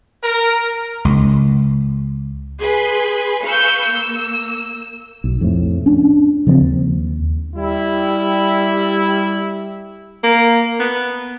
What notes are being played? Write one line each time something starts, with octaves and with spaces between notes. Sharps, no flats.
A#4
C#2
G#4 B4 G#5 C6
B4 F5 C#6 E6 G6
A#3 E6
B1
F2 A2
C#4 D4
C#3 F3 A3 C4
D#2
G3 E4
A#3
B3